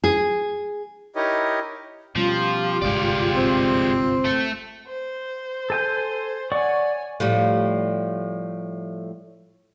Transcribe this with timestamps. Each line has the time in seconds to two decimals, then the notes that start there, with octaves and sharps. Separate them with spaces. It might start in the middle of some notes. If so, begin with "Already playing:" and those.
0.04 G#4
1.16 D#4 E4 G4 A#4 C#5 D#5
2.16 B2 F3 G3 C#4 F4 G4
2.82 G1 C2 G#2 G#3 D5
3.34 C4
4.25 A3 A4
4.87 C5
5.70 A4 G#5 G6
6.52 C#5 D5 F#5 G#5 C#6
7.20 A2 F3 G3